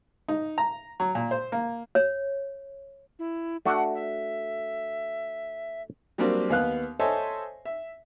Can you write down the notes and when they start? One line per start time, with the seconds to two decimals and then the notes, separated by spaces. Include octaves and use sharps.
0.28 D#4
0.58 A#5
1.00 F#3
1.15 A#2
1.31 C5
1.52 A#3
1.95 C#5
3.19 E4
3.66 A3 D4 F#4 F#5
3.94 E5
6.18 F#3 G3 A#3 C4 D4
6.50 D#2 B3 F5 F#6
6.99 A4 C5 C#5 D#5 E5 G#5
7.65 E5